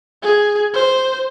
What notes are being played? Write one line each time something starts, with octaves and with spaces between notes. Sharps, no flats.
G#4
C5